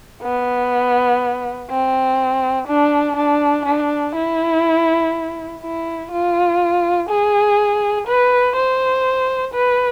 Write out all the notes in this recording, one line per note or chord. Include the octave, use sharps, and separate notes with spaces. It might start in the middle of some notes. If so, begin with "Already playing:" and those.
B3
C4
D4
D4
D4
E4
E4
F4
G#4
B4
C5
B4